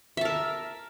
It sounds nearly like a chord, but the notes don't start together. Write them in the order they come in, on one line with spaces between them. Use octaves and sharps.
E5 A5 A#4